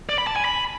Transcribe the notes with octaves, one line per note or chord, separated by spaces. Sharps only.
D5
B5
A5
G#5
B5